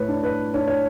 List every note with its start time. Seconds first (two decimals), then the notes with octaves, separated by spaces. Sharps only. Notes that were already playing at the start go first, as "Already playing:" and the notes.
Already playing: A2 B4 C#5
0.08 D4
0.23 B4
0.54 D4 C#5
0.67 C#5